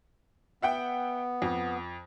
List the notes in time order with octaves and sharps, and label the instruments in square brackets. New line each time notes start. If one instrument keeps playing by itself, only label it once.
[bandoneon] B3 [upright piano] E5 F#5 G5
[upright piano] F2